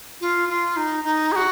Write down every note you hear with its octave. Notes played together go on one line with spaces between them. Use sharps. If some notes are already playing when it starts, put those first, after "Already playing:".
F4
F4
D#4
D#4
G#4
F#4